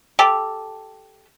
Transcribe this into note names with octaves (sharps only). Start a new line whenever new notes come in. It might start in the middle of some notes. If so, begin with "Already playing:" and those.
G4 A4